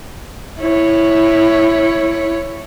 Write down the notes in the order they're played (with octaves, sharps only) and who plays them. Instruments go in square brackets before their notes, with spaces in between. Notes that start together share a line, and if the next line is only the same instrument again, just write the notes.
[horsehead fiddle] E4 C#5